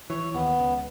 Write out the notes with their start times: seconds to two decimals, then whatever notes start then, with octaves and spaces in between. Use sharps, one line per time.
0.10 E3 C#5
0.34 D#2 B3
0.59 C#2